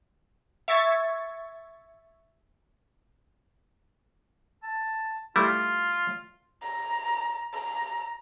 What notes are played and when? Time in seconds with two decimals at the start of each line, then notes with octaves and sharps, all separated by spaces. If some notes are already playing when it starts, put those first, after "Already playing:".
0.68 E5 C#6 G#6 A6
4.63 A5
5.36 G3 A3 E4 F4
6.62 A#5
7.53 A#5